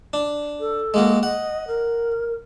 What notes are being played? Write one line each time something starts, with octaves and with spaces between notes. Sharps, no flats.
D4
A4
G#3 A#3 F#4
D#5 F#5
A#4